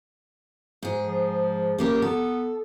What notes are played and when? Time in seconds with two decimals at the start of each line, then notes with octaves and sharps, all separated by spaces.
0.83 G#2 G#4
1.06 F3
1.78 C#3 A#3 G4 A#4
2.02 B3 A4